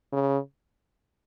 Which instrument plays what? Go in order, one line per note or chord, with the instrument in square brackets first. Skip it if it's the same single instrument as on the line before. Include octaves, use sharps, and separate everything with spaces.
[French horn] C#3